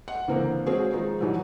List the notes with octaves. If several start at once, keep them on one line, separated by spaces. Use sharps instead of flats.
F#5
C#2 D3 E3 A#3 C4
G#3 C4 C#4 F#4 G#4
D#3 F3 G#3 D#4 C5
G#2 B2 E3 F#3 G3